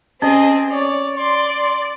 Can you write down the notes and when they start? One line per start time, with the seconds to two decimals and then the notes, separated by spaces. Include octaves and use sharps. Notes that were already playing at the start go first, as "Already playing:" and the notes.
0.22 C4 C#4 G#4 D#5
0.71 C#5 D5
1.18 D5 C6